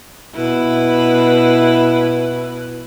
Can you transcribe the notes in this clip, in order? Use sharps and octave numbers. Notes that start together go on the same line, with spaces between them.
B2 E4 B4